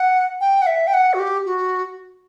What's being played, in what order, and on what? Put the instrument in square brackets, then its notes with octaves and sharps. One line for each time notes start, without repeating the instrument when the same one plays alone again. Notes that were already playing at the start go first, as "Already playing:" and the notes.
Already playing: [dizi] F#5
G5
F#5
E5
G5
F#5
F#4
G4
F#4